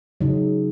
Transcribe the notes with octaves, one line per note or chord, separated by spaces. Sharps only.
C#3 F#3 D#4